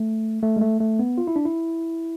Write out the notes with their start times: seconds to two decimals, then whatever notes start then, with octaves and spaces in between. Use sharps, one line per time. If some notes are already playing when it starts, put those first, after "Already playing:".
Already playing: A3
0.43 A3
0.57 G#3
0.61 A3
0.80 A3
0.99 B3
1.18 F4
1.27 E4
1.36 D4
1.45 E4